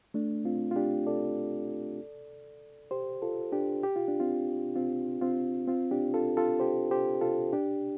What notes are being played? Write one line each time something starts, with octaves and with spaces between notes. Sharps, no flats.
A3 D4
C4 F4
F4
D4 G4
A4 D5
G4 C5
F4 A4
D4 G4
G4
F4
D4
C4 F4
C4 F4
C4 F4
C4 F4
D4 G4
F4 A4
F4 A4
G4 C5
G4 C5
F4 A4
D4 G4